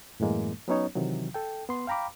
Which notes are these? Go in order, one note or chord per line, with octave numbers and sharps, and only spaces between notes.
F#2 A2 E3 G#3 A#3
F#3 B3 C#4 D#4 C#5
C3 D#3 E3 F#3
A4 G5
B3 C6
F5 G5 A#5 B5 D6